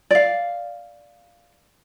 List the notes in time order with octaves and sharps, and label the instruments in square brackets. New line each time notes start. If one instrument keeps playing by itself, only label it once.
[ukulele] D5 F5